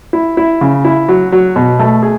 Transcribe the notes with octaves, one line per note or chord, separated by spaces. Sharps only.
E4
E4
C#3
E4
F#3
F#3
B2
A3
G#4